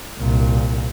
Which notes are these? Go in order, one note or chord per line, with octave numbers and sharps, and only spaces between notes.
C2 A#2